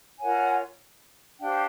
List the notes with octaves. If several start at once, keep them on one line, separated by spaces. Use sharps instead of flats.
F4 A#4 C#5 F#5 G#5
D4 G4 C5 F5 G5